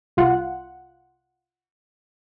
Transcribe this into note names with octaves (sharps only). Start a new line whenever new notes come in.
C2 F4 F#5